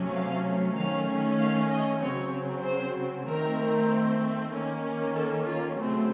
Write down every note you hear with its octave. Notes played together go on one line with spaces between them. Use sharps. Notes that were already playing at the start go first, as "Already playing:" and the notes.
Already playing: C3 F#3 A3 C#4
F5
D#3 A3 C#4 F5
F5
D#5
C#3 F#3 C4 C#5
C5
D#3 A3 C4 A#4
D#3 A#3 C#4
A4
F4
C#3 F#3 A3 C4 F#4